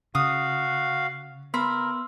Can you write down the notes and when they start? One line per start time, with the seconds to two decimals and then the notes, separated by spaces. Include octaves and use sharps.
0.15 C#3 F#4 F5 D#6
1.54 B3 A#4 B5 C6 E6